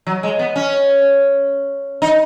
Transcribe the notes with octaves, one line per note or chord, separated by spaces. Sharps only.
F#3
G#3
B3
C#4
D#4